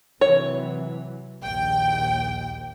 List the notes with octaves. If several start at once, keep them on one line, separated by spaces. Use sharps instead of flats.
C3 E3 F#3 C#5
A#1 D#2 G5